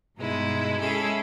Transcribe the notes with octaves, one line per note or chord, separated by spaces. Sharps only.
G2 B2 G#3 D#4 E4
G#3 C#4 E4 G#4 A4